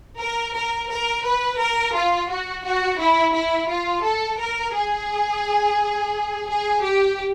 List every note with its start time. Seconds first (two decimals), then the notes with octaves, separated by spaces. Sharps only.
0.19 A#4
0.54 A#4
0.89 A#4
1.24 B4
1.59 A#4
1.94 F4
2.29 F#4
2.64 F#4
2.99 E4
3.34 E4
3.68 F4
4.03 A4
4.39 A#4
4.74 G#4
6.48 G#4
6.83 G4